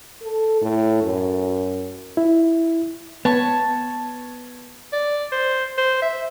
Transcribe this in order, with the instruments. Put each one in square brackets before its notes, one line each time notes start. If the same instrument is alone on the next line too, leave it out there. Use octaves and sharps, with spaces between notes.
[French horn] A4
A2
F#2
[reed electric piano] E4
[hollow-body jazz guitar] B3 [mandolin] C#5 A5
[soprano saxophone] D5
C5
C5
E5